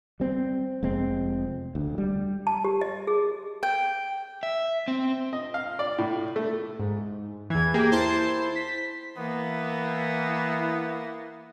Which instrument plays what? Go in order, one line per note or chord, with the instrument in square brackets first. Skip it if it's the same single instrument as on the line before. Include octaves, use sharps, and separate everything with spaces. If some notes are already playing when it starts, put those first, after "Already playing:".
[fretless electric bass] G3 C4
F1 G#3 C4
D2
G3
[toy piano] A5
G4
D#5
G#4
[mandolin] G5
[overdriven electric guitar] E5
C4
[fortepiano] D#5
F5
D5
A2
A3
[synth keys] G#2
[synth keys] E2 E3 [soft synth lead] G#6
[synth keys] A#3 G4 G#4
[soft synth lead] E4 [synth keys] C5 A5 C6
[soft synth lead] B6
[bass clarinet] E3 [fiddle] A#3 [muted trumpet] B3 [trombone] E4